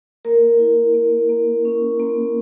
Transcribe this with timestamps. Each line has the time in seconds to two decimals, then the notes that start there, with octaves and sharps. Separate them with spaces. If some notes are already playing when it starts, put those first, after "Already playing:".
0.25 A#3 A#4
0.59 E4
0.94 A#3
1.29 A#3
1.65 C#4
2.00 A#3